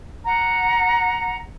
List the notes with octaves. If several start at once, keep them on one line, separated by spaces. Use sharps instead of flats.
F#5 A#5